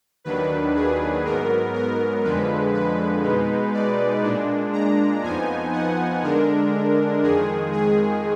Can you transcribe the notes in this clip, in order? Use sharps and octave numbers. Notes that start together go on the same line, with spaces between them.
D#2 D#3 F#3 D4 B4
G#4
G#2 F#3 B3 A#4
A#4
F2 D3 F3 G#3 B4
B4
B2 G#3 D#4
D5
A#2 G#3 D4
A#5
F2 F3 B3 D#4 G#5
F#5
D3 G#3 D4 A#4
F2 D#3 G#3 G#4
G#4